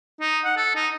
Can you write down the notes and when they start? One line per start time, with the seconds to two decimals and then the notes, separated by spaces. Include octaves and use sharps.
0.20 D#4
0.45 F#5
0.57 A4
0.76 D#4